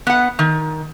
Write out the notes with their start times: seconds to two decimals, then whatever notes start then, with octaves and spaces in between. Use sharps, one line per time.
0.07 B3 F#5
0.39 D#3